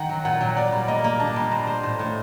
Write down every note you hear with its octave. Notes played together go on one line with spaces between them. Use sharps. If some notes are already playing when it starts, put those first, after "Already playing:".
Already playing: D#3 F#5 G5
F#3
A#2 F#5
F#3
A#3 D5
G3
A#3 D#5
A#3
D4 A5
G3
C5 A#5
C5
A2
A2